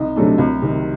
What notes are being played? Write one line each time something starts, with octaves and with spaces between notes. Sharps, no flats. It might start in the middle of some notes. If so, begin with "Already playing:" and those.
Already playing: C2 D#4
C3 F#3 A3 D4
C2
C3 D#3